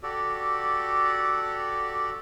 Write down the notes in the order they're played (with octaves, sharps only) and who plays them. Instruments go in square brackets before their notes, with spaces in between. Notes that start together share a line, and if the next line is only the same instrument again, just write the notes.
[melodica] F#4 G4 A4 D5